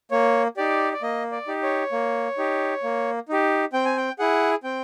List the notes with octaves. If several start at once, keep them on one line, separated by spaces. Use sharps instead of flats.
A#3 C#5
D#4 G4 D5
D5
A#3 D#5
D5
D#4 G4
C#5
A#3
D#4 G4
A#3
D#4 G4
C4 G5
G#5
G5
E4 G#4 F#5
C4 G5